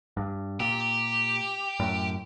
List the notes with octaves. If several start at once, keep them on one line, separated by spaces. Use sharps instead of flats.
G2
A#2 G4
F#2 A2